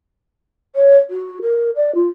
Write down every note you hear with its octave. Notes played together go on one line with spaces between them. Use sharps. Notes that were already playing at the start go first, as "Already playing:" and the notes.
C#5
F#4
A#4
D5
F4